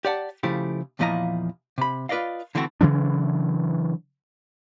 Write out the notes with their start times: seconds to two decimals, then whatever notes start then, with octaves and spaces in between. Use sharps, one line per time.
0.05 G4 D5 F#5 A5
0.43 C#3 F3 A3 E4 G4
0.99 E2 A#2 F3 E4 D#5 A#5
1.78 C3 B5
2.09 F4 B4 D5 D#5 F5
2.55 D3 E3 A3 C4 E4 F#4
2.81 C#3 E3 F#3 D4